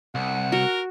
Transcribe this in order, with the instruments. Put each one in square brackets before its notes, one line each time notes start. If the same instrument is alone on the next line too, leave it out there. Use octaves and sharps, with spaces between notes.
[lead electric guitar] C2 [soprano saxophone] F#5
[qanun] F#4 [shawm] A#4